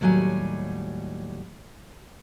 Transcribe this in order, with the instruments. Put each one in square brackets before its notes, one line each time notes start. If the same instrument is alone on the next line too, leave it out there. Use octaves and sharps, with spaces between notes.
[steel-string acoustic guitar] D#2 A2 F#3 G3 G#5